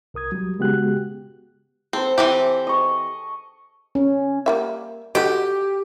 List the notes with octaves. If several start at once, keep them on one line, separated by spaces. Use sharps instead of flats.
C2 A#4 D#6 G#6
F#3 G3
C#3 G#3 B3 F#4 G4 F#6
C4 A4 C5
E3 C4 G4
D#5 C#6
C#4
G3 A#3 E5
F#4 G4 A4 D#5